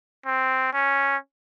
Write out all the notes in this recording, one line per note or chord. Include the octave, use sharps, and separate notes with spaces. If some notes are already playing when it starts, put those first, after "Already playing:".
C4
C#4